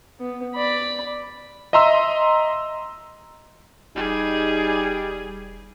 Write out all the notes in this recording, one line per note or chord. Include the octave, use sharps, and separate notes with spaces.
B3
D5 B5
D#5 E5 A#5 C6 E6
E1 G3 D#4 G#4